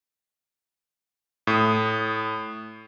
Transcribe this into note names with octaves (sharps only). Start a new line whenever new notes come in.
A2 D#6